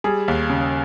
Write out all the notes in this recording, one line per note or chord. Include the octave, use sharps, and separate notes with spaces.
G3 G#4
D#2
C#3